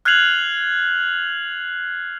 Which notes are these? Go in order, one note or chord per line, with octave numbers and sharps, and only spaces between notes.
F6 F#6 G#6 C7 F7 F#7